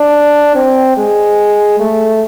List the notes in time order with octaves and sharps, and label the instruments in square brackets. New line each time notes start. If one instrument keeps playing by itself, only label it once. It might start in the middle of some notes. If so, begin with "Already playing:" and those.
Already playing: [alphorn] D4
C4
G#3
A3